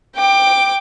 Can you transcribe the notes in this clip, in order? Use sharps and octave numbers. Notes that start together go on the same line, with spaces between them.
G5 D6